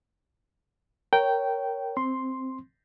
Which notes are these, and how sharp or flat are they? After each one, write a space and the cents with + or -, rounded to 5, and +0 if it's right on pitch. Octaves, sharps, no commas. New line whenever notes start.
A#4 +0 C#5 +0 G5 -10
C4 +0 C6 +0